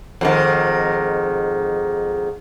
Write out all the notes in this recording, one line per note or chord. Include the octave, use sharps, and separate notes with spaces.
F2 G#2 D#3